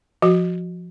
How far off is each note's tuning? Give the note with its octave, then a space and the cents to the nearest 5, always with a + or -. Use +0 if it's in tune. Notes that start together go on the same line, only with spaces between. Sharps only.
F3 +5 F#4 +0